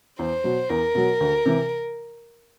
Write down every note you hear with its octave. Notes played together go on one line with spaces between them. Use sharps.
E2 C5
B2 F#3
E2 A#4
B2 F#3
D2
C3 E3